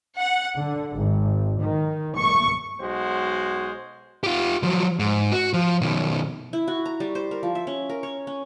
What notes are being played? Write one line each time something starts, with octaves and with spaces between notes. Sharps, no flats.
F#5
D3
G#1
D#3
C#6
B1 G#3 F#4 C5
F4 G4
F3 F#3
G#2
F#4
F3
B2 D#3
E4
F#4
A#5
G3
C5
A#4
F3
E5
C#4
A#4
C#5
C#4